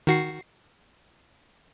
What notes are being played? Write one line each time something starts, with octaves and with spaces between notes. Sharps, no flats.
D#3 F#4 C7